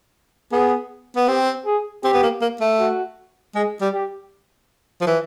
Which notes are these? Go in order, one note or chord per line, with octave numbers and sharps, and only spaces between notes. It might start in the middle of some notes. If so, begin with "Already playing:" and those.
B3 G#4
B3
C4 G4
G#4
C4 G4
B3
A#3
A#3
A3
F#4
G#3 G#4
G3
G4
F3
E3